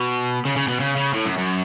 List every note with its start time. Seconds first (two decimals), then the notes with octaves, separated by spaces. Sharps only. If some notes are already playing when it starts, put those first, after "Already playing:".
Already playing: B2
0.45 C#3
0.57 C#3
0.68 B2
0.80 C#3
0.96 C#3
1.14 A2
1.26 F#2
1.38 F#2